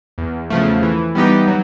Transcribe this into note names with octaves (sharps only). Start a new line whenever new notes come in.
E2
C#3 F3 A3
E3
G3 B3 D#4 G4
F#3